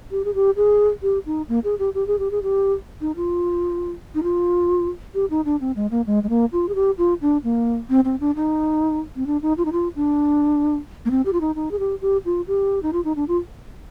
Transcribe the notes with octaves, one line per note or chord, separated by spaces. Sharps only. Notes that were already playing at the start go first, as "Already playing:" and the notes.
G4
G#4
G4
G#4
G4
D#4
A#3
G#4
G4
G4
G#4
G4
G#4
G4
D#4
F4
D#4
F4
G4
D#4
D4
C4
G#3
A#3
G#3
G#3
A#3
F4
G#4
G4
F4
D4
A#3
C4
C4
D4
D#4
C4
D4
D#4
F4
D#4
F4
D4
A#3
C4
G4
F4
D#4
D#4
G#4
G4
G4
F4
G4
D#4
F4
D#4
D4
F4